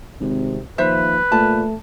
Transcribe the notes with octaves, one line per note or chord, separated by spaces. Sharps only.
G#1 C3
D#2 F3 B4 C5 E5
A#2 A3 A5